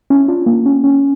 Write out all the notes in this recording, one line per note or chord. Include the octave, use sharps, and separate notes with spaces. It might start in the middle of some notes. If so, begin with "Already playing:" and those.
C#4 E4
D4 F4
A#3
C#4
C#4